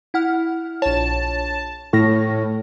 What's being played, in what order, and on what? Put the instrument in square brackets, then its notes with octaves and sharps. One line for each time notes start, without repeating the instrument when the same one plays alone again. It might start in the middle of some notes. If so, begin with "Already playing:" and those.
[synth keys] E4 F#5 F6
[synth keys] A#1 C#5 [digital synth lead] A5
[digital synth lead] A2 [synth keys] C#6 F6 A#6